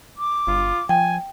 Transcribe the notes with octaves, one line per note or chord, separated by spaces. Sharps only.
D6
G1 F4
F3 G5 G#5